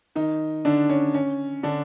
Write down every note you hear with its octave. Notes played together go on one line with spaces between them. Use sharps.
D#3 D#4
D3 D4
C#4
C#4
D3 D4